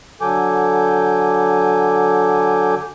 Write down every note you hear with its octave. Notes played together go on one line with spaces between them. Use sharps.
D3 F#3 A4 G#5 D6 G6